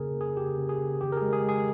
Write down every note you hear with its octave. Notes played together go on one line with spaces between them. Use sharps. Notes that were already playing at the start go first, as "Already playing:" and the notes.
Already playing: C#3 A#3 G#4 A#4
A#3
G#4
C#3 G4
C#3
G#4
C#3
D#3 G4
A#4
G#4
G#3
G#4
G#3
G#4